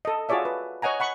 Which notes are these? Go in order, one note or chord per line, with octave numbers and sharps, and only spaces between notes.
A4 D#5
F4 F#4 G#4 C#5 D5 E5
B4
C#5 D#5 F#5 G#5 A#5
F#5 B5 C#6